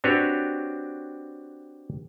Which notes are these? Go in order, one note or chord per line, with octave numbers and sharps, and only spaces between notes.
C4 D4 F#4 G4 B4 C#5